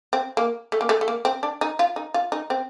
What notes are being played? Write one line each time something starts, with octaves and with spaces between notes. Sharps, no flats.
C4
A#3
A3
A#3
A3
A3
A#3
C4
D4
D#4
F4
D#4
F4
D#4
C4